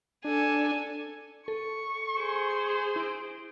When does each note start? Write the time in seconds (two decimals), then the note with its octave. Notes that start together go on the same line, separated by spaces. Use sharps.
0.24 D4 A4 G#5
1.48 A4 C#6
2.18 G#4 C5
2.50 G#6
2.96 E4 D7